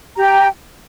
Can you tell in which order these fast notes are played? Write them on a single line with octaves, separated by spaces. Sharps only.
A#5 G4 G5